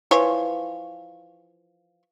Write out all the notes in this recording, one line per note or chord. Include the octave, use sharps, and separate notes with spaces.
E3 F3 C#5